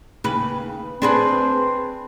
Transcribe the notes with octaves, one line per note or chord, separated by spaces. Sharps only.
D#2 C#3 B4
C4 D4 G#4 B4